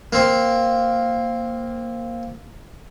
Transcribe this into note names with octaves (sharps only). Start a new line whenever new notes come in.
A#3 C4